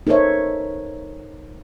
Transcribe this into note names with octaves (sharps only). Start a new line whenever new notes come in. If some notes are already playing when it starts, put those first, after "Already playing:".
D#4 A4 A#4 C5 C#5 E5